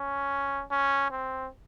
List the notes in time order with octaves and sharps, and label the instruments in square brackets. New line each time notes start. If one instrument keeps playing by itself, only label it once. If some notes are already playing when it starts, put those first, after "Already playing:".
Already playing: [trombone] C#4
C#4
C4